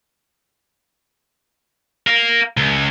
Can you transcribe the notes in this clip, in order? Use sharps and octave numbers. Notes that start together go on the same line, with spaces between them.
A#4 F5
C#2